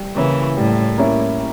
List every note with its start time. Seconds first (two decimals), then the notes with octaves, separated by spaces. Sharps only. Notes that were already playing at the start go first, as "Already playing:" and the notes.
Already playing: G3
0.16 C#3 E3 A#3 C#4 E4
0.57 A2 G3
0.98 A#3 C#4 E4